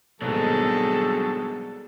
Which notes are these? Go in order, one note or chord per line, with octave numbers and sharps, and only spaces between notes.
D#2 G#2 B2 F#3 G3 D4 G#4 A4